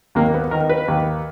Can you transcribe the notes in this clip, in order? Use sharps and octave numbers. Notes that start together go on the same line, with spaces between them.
D#2 A#3
B3
D#3 A#4
B4
D#2